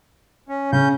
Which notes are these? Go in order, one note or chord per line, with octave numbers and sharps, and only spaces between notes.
C#4
C#3 C#4 G6